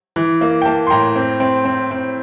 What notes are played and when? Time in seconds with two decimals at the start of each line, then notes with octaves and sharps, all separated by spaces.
0.16 E3
0.41 A#3
0.62 G5
0.65 A#3 A5
0.87 C6
0.90 A2 G5 A#5
1.16 C4
1.40 C4
1.65 C4
1.91 C4